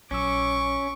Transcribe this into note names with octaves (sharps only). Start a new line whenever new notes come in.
A#1 F#3 C#4 C#6 D6 E6